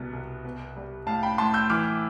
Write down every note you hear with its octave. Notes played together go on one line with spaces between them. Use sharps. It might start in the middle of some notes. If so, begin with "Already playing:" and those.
Already playing: C2 B2 B3
C2
B3
G3
A2 F5 A5
G5 B5
A2 A5 C6
E6 G6
E3 D6 F6